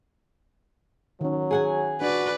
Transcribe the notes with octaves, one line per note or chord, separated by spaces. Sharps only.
D#3 F#3 C#4
G#4 F#5 G#5
D4 F#4 B4 D5